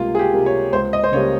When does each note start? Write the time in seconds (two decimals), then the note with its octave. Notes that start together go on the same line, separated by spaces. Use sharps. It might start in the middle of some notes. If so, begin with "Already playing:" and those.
Already playing: C#2 C3 G3 A#3 F4
0.15 G#4
0.19 G4
0.33 C3 G3 A#3
0.46 C#5
0.73 C#2 C5
0.93 D#5
1.04 C5
1.12 C#3 G3 A#3 C#5